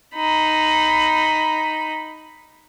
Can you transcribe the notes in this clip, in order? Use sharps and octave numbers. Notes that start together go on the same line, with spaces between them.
D#4 B5